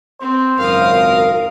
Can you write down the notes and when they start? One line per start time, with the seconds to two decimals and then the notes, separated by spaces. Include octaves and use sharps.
0.21 C4 C5
0.59 G#1 C#2 F#2 A#4 F5 D#6